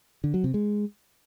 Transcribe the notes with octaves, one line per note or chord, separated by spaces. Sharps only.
D3
F#3
C3
G#3